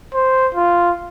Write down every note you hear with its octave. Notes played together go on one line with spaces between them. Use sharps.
C5
F4